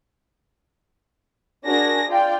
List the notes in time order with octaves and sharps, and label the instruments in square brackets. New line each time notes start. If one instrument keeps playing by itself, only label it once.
[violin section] D4 F#4 G#4 A#4 A#6
F4 D5 G5